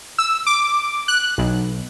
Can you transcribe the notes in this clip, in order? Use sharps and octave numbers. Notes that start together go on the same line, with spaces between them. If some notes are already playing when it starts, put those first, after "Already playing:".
E6
D6
F#6
B1